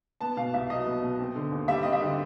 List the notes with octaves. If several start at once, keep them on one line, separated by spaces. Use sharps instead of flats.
B3 A5
B2 F5
C2 E5
F#3 D#5
B3
B2
C4
D3
D#2
G3 E5
C4 D#5
E5
D3